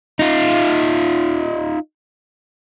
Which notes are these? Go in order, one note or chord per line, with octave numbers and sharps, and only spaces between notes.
D#4 F4